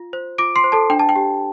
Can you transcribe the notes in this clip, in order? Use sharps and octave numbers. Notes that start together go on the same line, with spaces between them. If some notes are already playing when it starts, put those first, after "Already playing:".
Already playing: F4
C5
F4 D6 D7
C6 C7
C5
A4 A5
D4 G5
A5
G5
G4